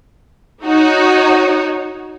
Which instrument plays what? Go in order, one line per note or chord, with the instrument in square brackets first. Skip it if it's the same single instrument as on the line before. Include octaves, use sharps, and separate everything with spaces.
[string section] D#4 F#4 C#5